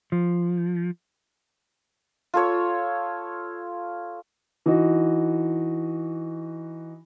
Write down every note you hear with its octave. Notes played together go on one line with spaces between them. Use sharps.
F3
F4 A4 C#5
E3 D#4 F#4